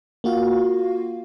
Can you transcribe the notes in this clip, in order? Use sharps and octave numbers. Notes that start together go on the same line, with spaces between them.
A#3 F4 F#4 F5